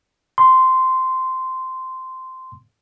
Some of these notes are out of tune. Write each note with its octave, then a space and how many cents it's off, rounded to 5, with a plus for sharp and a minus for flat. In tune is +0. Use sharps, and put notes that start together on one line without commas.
C6 -10